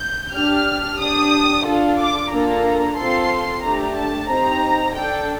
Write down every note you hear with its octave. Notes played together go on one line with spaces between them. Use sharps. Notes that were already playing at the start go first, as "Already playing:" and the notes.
Already playing: G6
D4 G4 F6
D4 G4 D#6
D4 F4 A4
D6
A#3 D4 F4 A4 A#5
C4 F4 A4 C6
A3 D4 G4 A#5
A5
C4 D#4 G4 A#5
D4 A4 G5